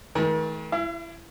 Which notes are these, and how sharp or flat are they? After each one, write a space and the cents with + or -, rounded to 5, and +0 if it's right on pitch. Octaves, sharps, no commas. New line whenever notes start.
D#3 +45 A3 -30 A#4 +40
E4 +20 F5 -45